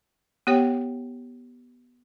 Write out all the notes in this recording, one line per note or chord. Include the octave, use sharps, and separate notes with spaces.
B3 G4 C#5 G5